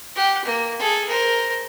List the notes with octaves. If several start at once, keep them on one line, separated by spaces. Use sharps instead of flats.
G4 F#5
A#3
G#4 A4
A#4 C5